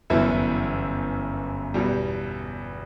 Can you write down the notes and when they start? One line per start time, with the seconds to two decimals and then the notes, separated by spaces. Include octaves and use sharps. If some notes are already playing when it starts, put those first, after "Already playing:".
0.10 G1 F#2 E3 B3 E4
1.74 E2 B2 G3